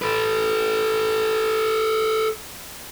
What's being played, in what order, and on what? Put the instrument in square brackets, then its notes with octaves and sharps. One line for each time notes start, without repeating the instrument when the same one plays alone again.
[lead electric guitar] A4 B4